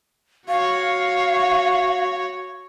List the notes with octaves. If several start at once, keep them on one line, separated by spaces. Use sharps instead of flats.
F#4 C#5 F5